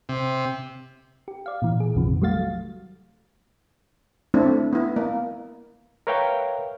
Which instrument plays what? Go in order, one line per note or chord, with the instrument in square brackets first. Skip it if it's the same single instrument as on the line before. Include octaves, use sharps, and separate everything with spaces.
[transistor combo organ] C3
[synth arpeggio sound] G4
D5 F5
A#2 E3
G#4
A#1 F2 C3 D#3 F3
F#3 G3 A3 F#4 F5 A6
[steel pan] A3 C4 D4 E4
B3 E4
A#3
[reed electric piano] A#4 B4 C#5 E5 F5 G5